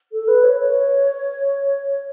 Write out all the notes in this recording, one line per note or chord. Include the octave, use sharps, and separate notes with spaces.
A4
B4
C#5
C#5